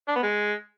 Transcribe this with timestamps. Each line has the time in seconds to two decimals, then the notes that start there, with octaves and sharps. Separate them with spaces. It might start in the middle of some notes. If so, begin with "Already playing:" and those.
0.08 D4
0.16 B3
0.23 G#3